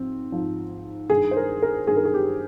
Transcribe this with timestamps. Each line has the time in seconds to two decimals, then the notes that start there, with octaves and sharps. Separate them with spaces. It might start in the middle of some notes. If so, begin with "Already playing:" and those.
Already playing: G#2 F3 C4
0.32 G#2 F3
1.10 G2 D#3 G#4
1.31 C5
1.37 A#4
1.62 A#4
1.87 G2 D#3 G#4
1.97 A#4
2.05 G#4
2.14 G4